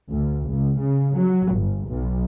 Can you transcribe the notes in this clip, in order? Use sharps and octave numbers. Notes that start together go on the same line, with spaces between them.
D2
C#2
C#3
F#3
G1
B1